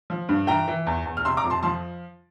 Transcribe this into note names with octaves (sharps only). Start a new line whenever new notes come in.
F3
G2
E3 G5 A#5
E3
E2
E2
F6
C3 C6 E6
A#5 D6
F2
A5 C6
F3 A5 C6